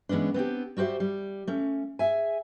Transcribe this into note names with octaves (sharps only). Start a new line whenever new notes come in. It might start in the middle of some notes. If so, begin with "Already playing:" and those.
E3 G#3 B3 C#4 D4
B3 C4 D4 G4
G3 F#4 G4 C5 E5
G3
A3 C#4
G#4 E5 G#5